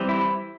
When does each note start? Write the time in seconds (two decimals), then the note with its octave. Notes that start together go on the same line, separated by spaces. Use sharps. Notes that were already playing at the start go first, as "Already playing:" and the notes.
Already playing: E3 G3 C4
0.09 E4